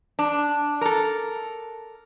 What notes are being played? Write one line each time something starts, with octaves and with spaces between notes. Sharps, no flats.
D4
A4 A#4